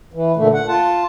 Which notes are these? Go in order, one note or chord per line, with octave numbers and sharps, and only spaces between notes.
E3
A#2 D3 A3
F#5
F4 A5